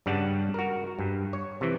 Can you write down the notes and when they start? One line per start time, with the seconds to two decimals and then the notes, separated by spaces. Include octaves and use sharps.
0.06 G2 C#3 G3 F#5 A5
0.54 F#4 A#4
0.99 G2
1.33 C#5
1.61 C3 E3